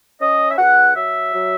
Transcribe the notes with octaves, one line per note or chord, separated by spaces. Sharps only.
C#4 D#5
E5
C#2 F#5
F#3 E5
F#3